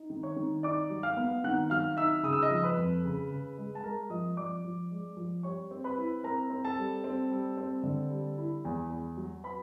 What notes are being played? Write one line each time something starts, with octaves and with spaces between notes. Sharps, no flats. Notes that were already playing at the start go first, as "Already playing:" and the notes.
Already playing: D#4
D#3
C#5 C#6
D#3
D#4 D5 D6
F#3
F5 F6
B3
D#3 F#5 F#6
F#3 F5 F6
D#4 E5 E6
C#3 D#6
E6
D#5 D#6
F3
B4 B5
F2
C#3
C#3
G#3
A5
G#3 A#4 A#5
F3 D#5 D#6
F3 D5 D6
F3
G#3
F3
G3 C#5 C#6
C4
B4 B5
E4
C4 A#4 A#5
C4
A4 A5
G3
C4
G3
C4
D3
G3
E4
E2
E2
F#3
B4 B5